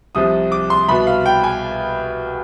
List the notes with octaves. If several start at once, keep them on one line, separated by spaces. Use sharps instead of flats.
C2 C3 F3 D#6
D6
C6
C2 B2 B5
F5
G5
G#5